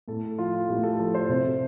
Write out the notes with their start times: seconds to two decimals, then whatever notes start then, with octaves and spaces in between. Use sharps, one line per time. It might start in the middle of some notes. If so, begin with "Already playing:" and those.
0.08 A2 A4
0.38 F3 F4
0.69 A2 G4
0.83 A4
0.99 F3
1.14 C5
1.29 C3